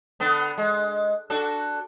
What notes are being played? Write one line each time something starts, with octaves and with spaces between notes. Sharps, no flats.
D3 B3
G#3
D4 F#4 A4